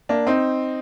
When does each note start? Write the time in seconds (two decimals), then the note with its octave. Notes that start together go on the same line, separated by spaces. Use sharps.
0.09 A#3 D4
0.27 C4 D#4